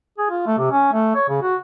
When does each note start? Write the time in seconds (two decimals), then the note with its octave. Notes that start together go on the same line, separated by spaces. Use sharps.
0.18 G#4
0.30 F4
0.47 A3
0.58 C3
0.72 C#4
0.93 A3
1.15 C#5
1.29 C#3
1.42 F#4